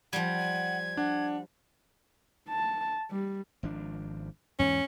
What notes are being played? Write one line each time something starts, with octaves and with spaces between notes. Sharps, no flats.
F3 G3 F#5 G#6
D4 F#5
A5
G3
G#1 F3 D4
E2 G#2 E3 C#4